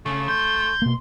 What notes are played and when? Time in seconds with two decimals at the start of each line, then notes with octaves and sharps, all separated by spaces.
0.05 C#3 A3
0.28 C6 G6
0.82 B2 A#3